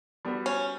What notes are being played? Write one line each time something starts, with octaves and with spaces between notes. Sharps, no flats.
G3 B3 F#4 B4
C#4